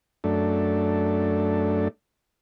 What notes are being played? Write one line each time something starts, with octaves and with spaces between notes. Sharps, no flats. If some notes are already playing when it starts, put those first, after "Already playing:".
F#2 A3 D4